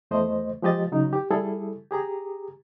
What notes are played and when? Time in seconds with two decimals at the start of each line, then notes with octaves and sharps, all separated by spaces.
0.11 E2 A3 C5 D#5
0.62 F3 G#3 G4 D#5 A6
0.92 C#3 F#3 D#4
1.13 G4
1.31 G3 E4 G#4 A4
1.91 G4 G#4 A#5